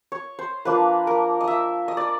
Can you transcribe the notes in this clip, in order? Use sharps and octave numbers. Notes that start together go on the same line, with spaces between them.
C#5
C5
F3 A#3 D4 B4
A#4
D#5
E5
D#5
D5